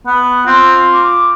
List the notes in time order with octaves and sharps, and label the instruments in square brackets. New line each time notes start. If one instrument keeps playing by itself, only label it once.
[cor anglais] B3 [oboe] F#5
[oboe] C4 [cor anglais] F4
[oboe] D6